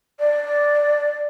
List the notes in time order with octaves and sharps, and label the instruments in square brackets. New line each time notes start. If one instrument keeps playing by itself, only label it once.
[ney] D5